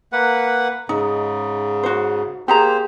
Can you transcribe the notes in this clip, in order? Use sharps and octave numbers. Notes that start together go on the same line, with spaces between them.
A#3 B4 F#5
G#2 C#3 D#4
F#4 C5
A#3 G4 G#4 C5 A#5